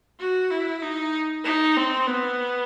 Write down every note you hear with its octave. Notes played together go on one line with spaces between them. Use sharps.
F#4
E4
D#4
D#4
C4
B3